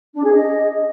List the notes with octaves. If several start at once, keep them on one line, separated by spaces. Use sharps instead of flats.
D4
G#4
D#5